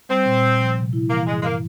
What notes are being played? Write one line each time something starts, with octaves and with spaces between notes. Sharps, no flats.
G3 C4
A#2
A#2
F3
C3
E4
E3 A#3
G2 G#3
G#3
A#3